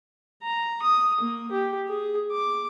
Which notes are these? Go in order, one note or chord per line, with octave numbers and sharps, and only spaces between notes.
A#5
D#6
A#3
G4
G#4
D6